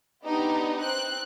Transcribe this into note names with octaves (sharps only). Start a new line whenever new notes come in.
B3 D4 D#4 G4
C4 F#6